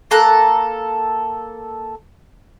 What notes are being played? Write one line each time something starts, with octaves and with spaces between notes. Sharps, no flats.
A#3 A4 A#5 F#6